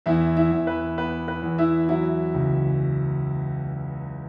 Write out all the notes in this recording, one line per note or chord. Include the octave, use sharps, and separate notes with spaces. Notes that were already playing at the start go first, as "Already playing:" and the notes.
E2 E4 E5
E4 E5
E2
B4
B3 B4
B4
E2
E4 E5
F#3 E4 E5
C#2